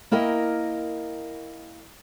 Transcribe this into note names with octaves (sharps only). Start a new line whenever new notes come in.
A#3 E4 A#4 D#5 G5